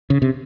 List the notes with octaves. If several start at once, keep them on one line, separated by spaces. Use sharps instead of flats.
C#3
C3